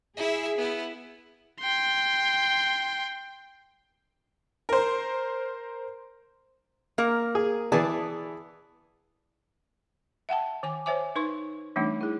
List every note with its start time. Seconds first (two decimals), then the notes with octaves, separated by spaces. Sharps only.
0.17 E4 G#4 E5
0.58 B3 E4
1.61 G5 C6
4.69 A#4 C5
6.98 A#3 A#4
7.35 G#4
7.72 E3 B3 G#4 D5 A5
10.29 E5 F#5 G5 A5
10.63 D#3 G#5 D6
10.86 C5 C#5 E5 G#5 D6
11.16 D#4 B4 C6 C#6
11.76 E3 G3 A3 C4 D4 D#4
12.01 E4 G#4